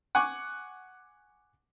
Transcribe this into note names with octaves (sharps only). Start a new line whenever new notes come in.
F#5 G#5 C#6 D6